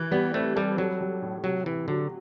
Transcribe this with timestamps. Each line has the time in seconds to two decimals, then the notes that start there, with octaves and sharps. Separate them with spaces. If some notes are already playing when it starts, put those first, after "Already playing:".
Already playing: E3
0.11 G3 B3
0.34 A3 C4
0.56 G3 A4
0.77 F#3 G3
1.01 G3
1.22 A2
1.44 C3 F#3
1.66 C3 E3
1.88 D3 F#3